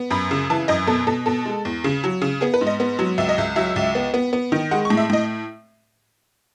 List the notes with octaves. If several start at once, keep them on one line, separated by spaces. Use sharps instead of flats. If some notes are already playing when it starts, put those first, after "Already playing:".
Already playing: B3
F#2 B5
C#3
E3 A5
F#2 D#5
B2 A4
B2 A4
B2 A4
G#3
E2
C#3
F#3
C#3
B3 G#4
B4
G#2
D#5
B3
F#3
C#2 E5
D#5
C#2 E5
F#3 E5
C#2
B3
B3
B3
D#3
G#3 F#5
C#6
A2
E5
A2 D#5